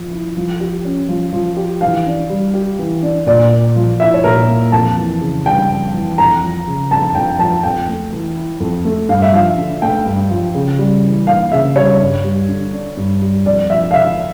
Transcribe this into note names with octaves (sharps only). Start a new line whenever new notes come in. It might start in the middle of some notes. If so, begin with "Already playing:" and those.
Already playing: F3
E4
F3
G4
C#4
F3
F3
G4
E3 F5
D4
G3
G4
E3
D4
A#2 D5
A#3
F3
E4 E5
C#5
A#2 A#4
A#3
F2 A5
E3
C#3
G3 G5
F2
E3
F2 A#5
F3
C#3
F2 A5
F2 G5
F3 A5
F2 G5
A3
E3
E4
F2
A3
G2 F5
E5
F3 F5
D3
A3 G5
G2
F3
C#3
G3
E3
A#3 F5
C#3 E5
G3 C#5
G2
G3
D3
D4
G2
G3
F2 D5
F3 E5
F5
D3 E5